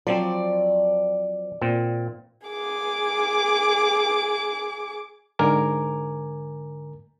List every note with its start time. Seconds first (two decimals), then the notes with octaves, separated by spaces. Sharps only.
0.07 F3 F#3 C4 D5
1.61 A#2 C4
2.47 G#4 D6
5.39 G#2 D3 A#4 G#5 A#5 D6